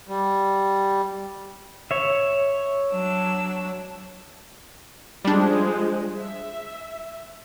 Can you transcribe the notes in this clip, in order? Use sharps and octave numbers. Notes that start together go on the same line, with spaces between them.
G3
C#5 E5
F#3 D4 E6
F3 G3 G#3 D4 C5
E5